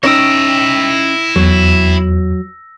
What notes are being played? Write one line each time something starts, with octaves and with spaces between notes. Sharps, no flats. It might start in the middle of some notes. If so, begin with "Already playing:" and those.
C#4 D#4 E4 C#5 G5 E6 A#6
E2 F#3